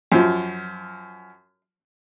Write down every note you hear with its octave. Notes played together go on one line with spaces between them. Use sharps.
F#2 F3